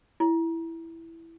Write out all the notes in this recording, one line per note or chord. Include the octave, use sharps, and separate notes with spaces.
E4